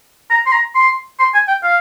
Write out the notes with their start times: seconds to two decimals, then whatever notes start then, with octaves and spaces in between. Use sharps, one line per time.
0.30 A#5
0.46 C6
0.52 A#5
0.75 C6
1.19 C6
1.34 G#5
1.48 G5
1.63 F5